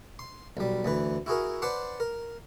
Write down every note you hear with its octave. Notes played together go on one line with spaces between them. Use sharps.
C6
B1 G3
D2 E3 B4
E4 F#4 G#4 A#4
B4 C5 D5 F#5 A5 C6
A#4